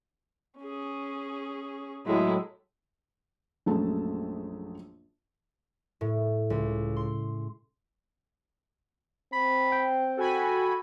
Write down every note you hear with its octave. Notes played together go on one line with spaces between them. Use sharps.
C#4 G#4
A2 F#3 G#3 E4
A#1 F#2 G#3 A3 A5
A2
C#2
C6
C4 B5
G5
F#4 A4 G#5 B5